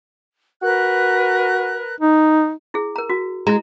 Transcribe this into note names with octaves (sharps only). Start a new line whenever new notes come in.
F#4 A#4 B4 F#6
D#4
E4 G#4
A#4 A#5
F#4
G#3 E4 A#5